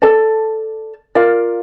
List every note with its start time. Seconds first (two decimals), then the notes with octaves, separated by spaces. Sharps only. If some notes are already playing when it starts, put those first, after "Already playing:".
0.02 A4 D5 A5
1.15 F4 A#4 D5 F5